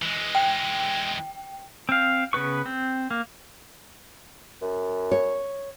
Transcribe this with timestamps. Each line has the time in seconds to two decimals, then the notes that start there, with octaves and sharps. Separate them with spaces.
0.02 E3 G#3
0.35 G5
1.89 C4 F5
2.33 C#3 B3 B4 C#6
2.66 C4
3.11 A#3
4.62 F#2
5.11 C#5